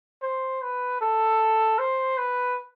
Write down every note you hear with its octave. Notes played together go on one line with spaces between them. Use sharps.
C5
B4
A4
C5
B4